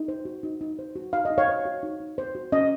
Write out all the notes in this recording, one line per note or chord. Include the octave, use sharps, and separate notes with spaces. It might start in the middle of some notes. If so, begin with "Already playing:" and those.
Already playing: D#4
C5
F#4
D#4
D#4
C5
F#4
D#4 F5
D#5
D#4
C#5 F5
C5
F#4
D#4
D#4
C5
F#4
C#4 D#5